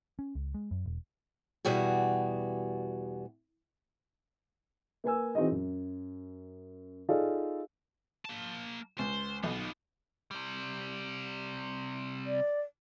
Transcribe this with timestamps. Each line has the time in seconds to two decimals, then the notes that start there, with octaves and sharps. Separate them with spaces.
0.19 C#4
0.35 C#2
0.54 G#3
0.71 F#2
0.86 E1
1.65 E2 B2 G3 F#4 G#4
5.04 A#3 B4 G#5 E6
5.35 E3 C4 D#4 F#4 G#4 D#5
5.51 F#2
7.09 D#4 F4 G#4 A4 D5 F5
8.25 A#3 A5
8.99 C#2 C5
9.44 B1 D#4 F4
10.31 C3 G3
12.26 D5